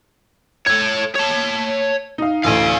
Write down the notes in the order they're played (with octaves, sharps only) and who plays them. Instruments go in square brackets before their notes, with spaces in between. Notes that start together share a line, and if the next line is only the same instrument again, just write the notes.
[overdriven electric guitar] A4 C#5 [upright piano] G#6
[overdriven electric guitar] C#5 A5
[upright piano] D#4 F5
[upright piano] A1 D2 [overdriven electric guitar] F5 G#5